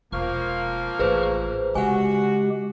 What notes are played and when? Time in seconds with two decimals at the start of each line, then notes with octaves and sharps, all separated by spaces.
0.12 E1 F3 A#3 C#6 F6
0.99 A1 G#4 B4 C5
1.75 C#3 G#3 F#4 G4 F#5 G#5